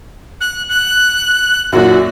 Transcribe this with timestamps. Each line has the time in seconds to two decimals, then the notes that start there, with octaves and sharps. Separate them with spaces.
0.41 F#6
0.69 F#6
1.72 F#2 A#2 F#4